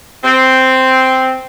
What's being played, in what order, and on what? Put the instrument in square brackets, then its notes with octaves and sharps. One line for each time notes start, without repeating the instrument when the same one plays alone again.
[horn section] C4